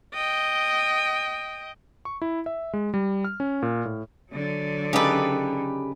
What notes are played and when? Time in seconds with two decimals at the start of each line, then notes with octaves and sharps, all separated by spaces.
0.14 D#5 G5
2.05 C#6
2.22 E4
2.46 E5
2.73 G#3
2.94 G3
3.24 F6
3.40 C#4
3.62 A#2
3.85 A2
4.32 D3 F#3
4.93 C#3 D#4 G4 A4 B4